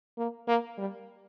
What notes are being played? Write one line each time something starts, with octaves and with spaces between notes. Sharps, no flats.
A#3
A#3
G3